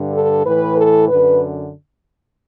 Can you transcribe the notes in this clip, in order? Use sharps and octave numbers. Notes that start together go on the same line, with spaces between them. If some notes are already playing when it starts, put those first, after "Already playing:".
Already playing: G2 D3
A4
A2 E3 B4
A4
F#2 D3 B4